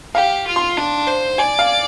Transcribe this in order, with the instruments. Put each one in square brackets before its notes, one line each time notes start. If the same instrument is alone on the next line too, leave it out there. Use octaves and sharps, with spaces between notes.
[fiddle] G4 [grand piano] F5
[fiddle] F4
[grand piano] C6
[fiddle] D4
C5
[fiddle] D5 [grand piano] G#5
[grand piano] F5